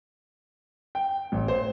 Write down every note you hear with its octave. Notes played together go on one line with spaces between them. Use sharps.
G5
A1
C5